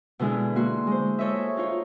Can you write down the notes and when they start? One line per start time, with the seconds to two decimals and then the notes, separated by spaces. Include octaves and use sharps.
0.19 B2 D3 G#3 E4 G#4
0.55 A#3 F#4 C6
0.87 G#3 C5
1.19 G#4 A4 C#5 D#5 E5
1.57 D#4 F4 C#5